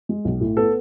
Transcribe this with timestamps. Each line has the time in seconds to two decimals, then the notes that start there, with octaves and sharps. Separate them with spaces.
0.09 G#3
0.25 B1
0.41 A2
0.57 B3 A4